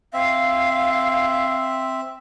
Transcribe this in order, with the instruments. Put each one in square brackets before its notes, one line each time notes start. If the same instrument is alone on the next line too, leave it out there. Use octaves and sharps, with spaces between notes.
[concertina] C4 E5 [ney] F5